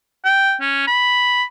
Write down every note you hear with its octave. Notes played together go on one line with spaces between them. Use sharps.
G5
C#4
B5